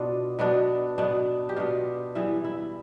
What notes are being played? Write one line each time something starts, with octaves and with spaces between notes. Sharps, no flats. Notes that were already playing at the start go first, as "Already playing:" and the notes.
Already playing: B2 B3 D4 F4
B2 B3 D4
B2 B3 D4
G4
B2 B3 D4 F4
E3 G3 B3 E4
E4